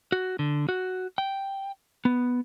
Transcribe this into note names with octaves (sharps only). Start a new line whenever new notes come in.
F#4
D3
F#4
G5
B3